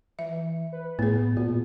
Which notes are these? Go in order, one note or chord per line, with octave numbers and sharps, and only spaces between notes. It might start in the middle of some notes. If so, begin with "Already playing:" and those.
E3 E5
B4
A2 A3 B3 G#4
A#2 F#4